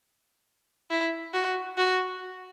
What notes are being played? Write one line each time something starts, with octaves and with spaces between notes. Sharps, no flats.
E4
F#4
F#4